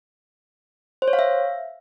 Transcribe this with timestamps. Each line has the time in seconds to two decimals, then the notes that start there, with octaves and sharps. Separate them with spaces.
1.02 C5
1.08 C#5
1.13 F5
1.19 E5